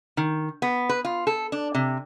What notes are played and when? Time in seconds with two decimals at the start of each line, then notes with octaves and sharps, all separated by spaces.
0.17 D#3
0.62 B3
0.89 B4
1.05 F4
1.27 A4
1.52 D4
1.75 C3